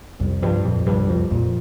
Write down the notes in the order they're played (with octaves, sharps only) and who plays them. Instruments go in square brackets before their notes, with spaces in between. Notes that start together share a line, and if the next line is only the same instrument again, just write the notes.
[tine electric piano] C2 [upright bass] F2
[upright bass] G2 [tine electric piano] F3
[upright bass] F2 [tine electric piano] A#2
[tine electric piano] C2 [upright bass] G2
[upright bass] F2 [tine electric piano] F3
[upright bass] F2 [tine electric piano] A#2